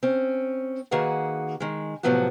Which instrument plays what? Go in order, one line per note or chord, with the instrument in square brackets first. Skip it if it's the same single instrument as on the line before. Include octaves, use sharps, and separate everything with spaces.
[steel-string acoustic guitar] C4 C#4
D#3 A#3 F#4 G#4 B4 F#5
D#3 G#3
A2 C3 F3 F#3 B3 F#4